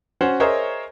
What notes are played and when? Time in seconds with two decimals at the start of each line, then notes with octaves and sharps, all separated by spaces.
0.21 C#4 F#4 C5 F#5
0.40 G#4 A#4 C5 C#5 D#5 E5